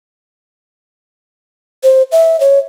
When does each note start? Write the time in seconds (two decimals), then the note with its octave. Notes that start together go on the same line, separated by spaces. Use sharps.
1.83 C5
2.12 E5
2.40 C#5